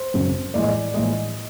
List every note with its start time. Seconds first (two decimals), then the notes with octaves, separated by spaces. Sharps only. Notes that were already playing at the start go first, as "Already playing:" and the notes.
Already playing: C5
0.14 G#1 F#2 C#3
0.54 A#1 A2 E3 G#3 D5
0.62 D#5
0.68 D5
0.94 A#1 A2 E3 G#3 D#5